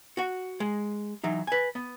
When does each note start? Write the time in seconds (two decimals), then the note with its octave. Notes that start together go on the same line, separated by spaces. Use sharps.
0.17 F#4 F#5
0.60 G#3
1.24 E3 F#3 D#4
1.47 B4 G#5
1.75 B3